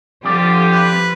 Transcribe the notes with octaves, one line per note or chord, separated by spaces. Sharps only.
F2 D3 F3 G3 F4 G4 D5
B4